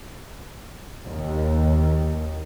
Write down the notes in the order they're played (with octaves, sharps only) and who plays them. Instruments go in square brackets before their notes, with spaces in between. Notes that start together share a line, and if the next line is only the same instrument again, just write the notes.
[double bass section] D#2